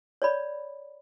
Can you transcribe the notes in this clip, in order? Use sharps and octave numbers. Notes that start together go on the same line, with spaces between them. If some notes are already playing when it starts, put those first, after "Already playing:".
C#5 D5 B5